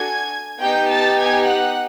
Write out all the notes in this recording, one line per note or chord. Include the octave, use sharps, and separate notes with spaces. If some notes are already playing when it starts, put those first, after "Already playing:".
Already playing: D4 F#4 A4 G#5 G#6
B3 D#4 G4 G5 G6
A5 A6
G#5 G#6
F#5 F#6